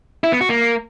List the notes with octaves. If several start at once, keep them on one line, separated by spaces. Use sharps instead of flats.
E4
B3
F#4
A#3